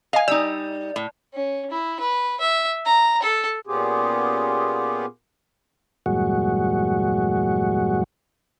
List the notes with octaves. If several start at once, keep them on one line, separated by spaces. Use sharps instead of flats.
D#5 F5 G#5
G3 D#4 D5 E6
A2
C#4
E4
B4
E5
A#5
A4
A#2 B3 C#4 F4 G4 G#4
E2 G2 A#2 F#3 G#3 F#4